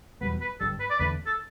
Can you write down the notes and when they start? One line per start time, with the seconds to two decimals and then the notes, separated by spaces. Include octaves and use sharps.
0.21 E2 B2 G3 B3 B4
0.41 B4
0.60 G1 G2 G3 A4
0.80 B4
0.90 D5
0.99 E2 D3 A3 D4 B4
1.26 A4